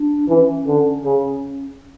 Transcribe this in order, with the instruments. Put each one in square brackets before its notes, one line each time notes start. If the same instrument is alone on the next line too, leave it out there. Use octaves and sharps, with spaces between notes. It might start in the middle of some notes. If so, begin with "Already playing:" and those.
Already playing: [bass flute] D4
[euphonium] E3 [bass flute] C#4
[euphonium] D3
C#3